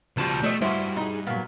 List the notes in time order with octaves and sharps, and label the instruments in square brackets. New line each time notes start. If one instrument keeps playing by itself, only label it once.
[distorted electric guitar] C#2 A5 [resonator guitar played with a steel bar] B2 F3 G3
[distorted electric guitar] A3 [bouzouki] D4 D#5
[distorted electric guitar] G2 [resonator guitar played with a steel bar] E4 F#4 [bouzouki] C5
[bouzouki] D#4 G#4
[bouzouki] A#2 [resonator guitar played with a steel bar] F#3 B3